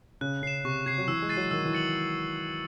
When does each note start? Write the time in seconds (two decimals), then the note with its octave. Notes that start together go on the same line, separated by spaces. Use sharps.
0.21 C#3 F#6
0.43 C#3 C7 E7
0.65 C3 C#6
0.86 C3 G#6 C7
0.98 F#3
1.08 E3 E6
1.22 G#3
1.29 A6 C7 D#7
1.37 F#3
1.51 D#3 E6
1.66 E3
1.73 A6 C#7 F#7